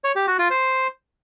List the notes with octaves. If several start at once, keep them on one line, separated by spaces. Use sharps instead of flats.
C#5
G4
F#4
F4
C5